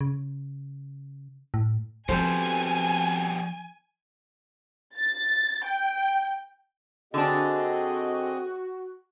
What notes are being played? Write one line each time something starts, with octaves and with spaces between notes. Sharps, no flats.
C#3
A2
B2 F3 G3 C4 A4 C5 G#5
A6
G5
D3 C4 D4 F#4 G#4 D#5